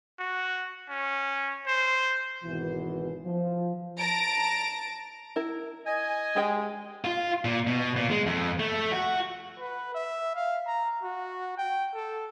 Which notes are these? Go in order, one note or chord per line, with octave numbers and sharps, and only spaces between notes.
F#4
C#4
C5
G#1 B2 E3
F3
A5 A#5 A#6 D7
E4 A#4
D#5 G#5
G#3 G4 G#4 G5
F4
A#2
B2
A#2
G#3
F2
A3
F#4
B4
E5
F5
A#5
F#4
G5
A4